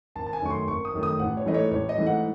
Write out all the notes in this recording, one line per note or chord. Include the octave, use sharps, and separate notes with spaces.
G#1 A5
A5
G#5
F#2 D#3 A3 C#6
C6
G#1 C#6
D#6
F#2 D#3 A3
D#6
A1 F#5
C#5
G#2 E3 A3 D#5
C#5
A1 C#5
D#5
G#2 E3 A3
F#5